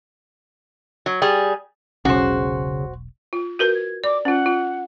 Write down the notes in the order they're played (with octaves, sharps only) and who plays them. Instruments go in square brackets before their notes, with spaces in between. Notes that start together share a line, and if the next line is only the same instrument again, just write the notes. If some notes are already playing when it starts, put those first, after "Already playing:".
[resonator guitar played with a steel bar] F#3
G3 G#4
[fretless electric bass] E1 B1 [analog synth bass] C#3 [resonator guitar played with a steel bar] F#4 C5
[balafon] F4
[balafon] F#4 A#4 B4 [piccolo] G6
[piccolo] G#6
[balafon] D5 [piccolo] D6
[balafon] C#4 F4 [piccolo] F#5
[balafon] F4